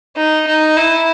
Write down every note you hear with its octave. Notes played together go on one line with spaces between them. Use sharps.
D#4
D#4
E4